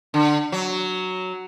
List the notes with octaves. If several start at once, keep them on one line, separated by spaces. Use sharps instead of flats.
D3
F#3